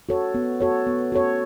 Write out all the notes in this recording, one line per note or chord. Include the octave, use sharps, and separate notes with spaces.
F#4 A4 C#5
B3
F#4 A4 C#5
B3
F#4 A4 C#5